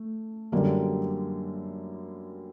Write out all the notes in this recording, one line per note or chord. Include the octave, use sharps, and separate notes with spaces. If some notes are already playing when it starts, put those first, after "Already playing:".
Already playing: A3
F#2 D3 G3 A#3